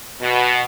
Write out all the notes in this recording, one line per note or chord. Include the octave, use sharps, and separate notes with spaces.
B2